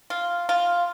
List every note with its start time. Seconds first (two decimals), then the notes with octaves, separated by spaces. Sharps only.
0.10 F4
0.49 F4